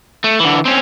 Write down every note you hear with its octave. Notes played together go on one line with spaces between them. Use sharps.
A3
D3 E3
C4 C#4